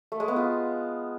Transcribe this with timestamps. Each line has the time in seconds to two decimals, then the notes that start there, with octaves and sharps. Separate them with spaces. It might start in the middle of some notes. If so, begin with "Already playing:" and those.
0.12 A3
0.20 G#3
0.28 B3
0.36 F4